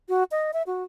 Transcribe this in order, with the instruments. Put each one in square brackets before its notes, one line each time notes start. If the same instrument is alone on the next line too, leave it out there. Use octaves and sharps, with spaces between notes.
[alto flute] F#4
D#5
E5
F#4